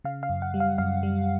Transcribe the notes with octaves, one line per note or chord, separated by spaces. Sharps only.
C#3 F5
F5
F#2
F#5
G3
F5
F#2 F5
G3